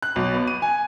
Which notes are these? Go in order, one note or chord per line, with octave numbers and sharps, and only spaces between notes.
F#6
B1
B3
D#7
G#5